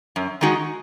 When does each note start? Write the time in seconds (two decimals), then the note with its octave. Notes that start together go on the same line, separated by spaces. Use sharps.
0.16 F#2
0.41 D#3 G#3 D#4 F#4